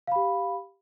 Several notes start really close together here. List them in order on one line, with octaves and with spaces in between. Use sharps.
F5 B5 G4